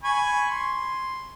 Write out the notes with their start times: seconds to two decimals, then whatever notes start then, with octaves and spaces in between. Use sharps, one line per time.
0.04 G#5 B5 C#6
0.50 C6